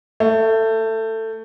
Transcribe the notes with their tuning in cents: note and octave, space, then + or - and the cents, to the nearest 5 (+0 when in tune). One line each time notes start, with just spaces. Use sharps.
A3 +15